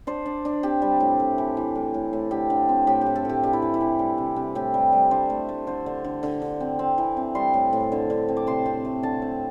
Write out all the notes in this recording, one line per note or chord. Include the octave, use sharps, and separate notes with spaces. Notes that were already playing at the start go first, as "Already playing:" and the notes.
D4 C5
D4
D4
C4 G4
G3
A2
A3
E3
E3
A2
A2
A2
D3 G4
D3
C4
A2 G4
A2 G4
A4
A2 G4
D4 G4
E4
E3
E4
E3
G3
C3
C3
A2 G4
G3
G3
D4 C5
A3
A3
D3 C5
D3
D3
D3
D3
C4
C4
E3
C4
G3 C6
A2
A2
D3
D3
C4
D6
C3 C6
C4
A3
D3 A5
C4